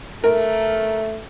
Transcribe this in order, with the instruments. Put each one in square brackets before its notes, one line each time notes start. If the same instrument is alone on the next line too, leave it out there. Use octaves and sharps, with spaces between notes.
[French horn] A3 [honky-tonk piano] A#4